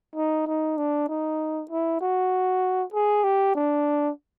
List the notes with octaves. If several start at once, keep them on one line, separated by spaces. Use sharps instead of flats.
D#4
D#4
D4
D#4
E4
F#4
G#4
G4
D4